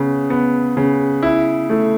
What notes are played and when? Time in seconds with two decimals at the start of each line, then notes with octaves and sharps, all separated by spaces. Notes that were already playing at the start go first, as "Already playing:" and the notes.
Already playing: C#3 B3
0.30 B3
0.77 C#3
1.23 E4
1.70 A3